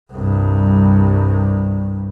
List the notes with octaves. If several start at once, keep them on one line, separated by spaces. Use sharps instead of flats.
C2 G2